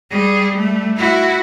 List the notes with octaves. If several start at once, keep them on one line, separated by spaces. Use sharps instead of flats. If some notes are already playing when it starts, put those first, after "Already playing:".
G3 G#4
G3 A3
E4 F#4